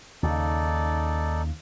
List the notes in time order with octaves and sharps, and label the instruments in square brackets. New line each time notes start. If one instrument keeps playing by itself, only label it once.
[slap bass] D#2 C#3 [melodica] D#4 A4 D5